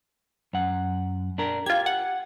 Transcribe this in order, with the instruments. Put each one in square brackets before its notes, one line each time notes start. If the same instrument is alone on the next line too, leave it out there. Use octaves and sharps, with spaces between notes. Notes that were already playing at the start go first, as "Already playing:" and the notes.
[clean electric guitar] F#2 F#5
D4 A#4
[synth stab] F4 G#6 [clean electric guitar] G4
[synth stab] F#5